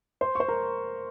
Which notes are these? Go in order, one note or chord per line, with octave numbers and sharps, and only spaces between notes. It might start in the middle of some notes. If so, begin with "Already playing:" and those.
C5 C6
C#6
C5 C6
A#4 A#5